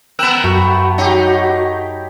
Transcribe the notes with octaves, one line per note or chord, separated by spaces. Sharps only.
B3 A#4 G5 B5 E6 F#6
F#2 A3 F#4
F#3 D#4 G4